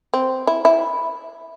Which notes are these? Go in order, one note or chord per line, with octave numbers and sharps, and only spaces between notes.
C4
E4
E4